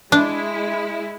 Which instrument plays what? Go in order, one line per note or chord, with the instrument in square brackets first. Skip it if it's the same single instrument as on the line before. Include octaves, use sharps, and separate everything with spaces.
[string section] G#3 E4 [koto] D4